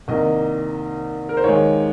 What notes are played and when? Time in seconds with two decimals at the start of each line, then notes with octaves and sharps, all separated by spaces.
0.08 C2 C3 D#3 A#3 D#5
1.29 A#4
1.37 C5
1.44 D#2 D#3 G#3 C#5